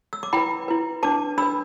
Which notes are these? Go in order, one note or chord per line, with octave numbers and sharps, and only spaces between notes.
E6
D6
E4 B4 G5 B5
E4 B4
D4 B4 A5 D6
D4 B4 B5 E6